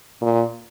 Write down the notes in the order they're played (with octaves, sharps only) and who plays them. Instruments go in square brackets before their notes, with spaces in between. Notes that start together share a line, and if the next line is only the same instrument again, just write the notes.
[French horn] A#2